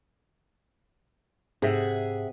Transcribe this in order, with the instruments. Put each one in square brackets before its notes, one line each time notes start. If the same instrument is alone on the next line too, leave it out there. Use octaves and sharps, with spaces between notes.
[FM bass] G#2 [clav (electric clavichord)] C3 [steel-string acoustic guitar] G#4 E5 F#5